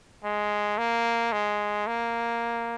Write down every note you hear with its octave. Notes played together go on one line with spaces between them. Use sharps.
G#3
A#3
G#3
A#3